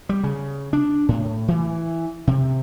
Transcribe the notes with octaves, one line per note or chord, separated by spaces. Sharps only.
G3
C#3
D4
A2
E3
C3